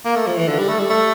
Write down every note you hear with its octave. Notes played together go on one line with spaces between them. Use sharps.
A#3
A3
F3
E3
D3
G3
A3
G3
A3